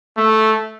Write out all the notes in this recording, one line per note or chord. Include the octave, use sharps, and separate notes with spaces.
A3